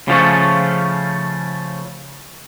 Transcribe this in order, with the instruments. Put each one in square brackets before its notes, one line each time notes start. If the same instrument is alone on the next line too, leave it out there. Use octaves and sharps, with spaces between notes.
[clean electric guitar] C#3 F3 A3 C#4